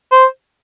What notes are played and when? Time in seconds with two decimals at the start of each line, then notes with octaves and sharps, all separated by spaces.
0.11 C5